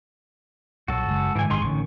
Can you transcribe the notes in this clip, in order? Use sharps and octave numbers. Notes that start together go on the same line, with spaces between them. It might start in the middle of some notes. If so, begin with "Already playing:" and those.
B1 A#2 F#3 F#4 A4
F#1 G#3
G#2 D3 E3 G#5
G#1 G2 C3 D#4 G#4 C6
A1 D3 D#3 C#4 C#6